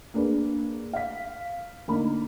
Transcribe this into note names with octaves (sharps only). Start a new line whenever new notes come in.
A#3 D4 G#4 B4
F5 B6
D3 A#3 D#4 B5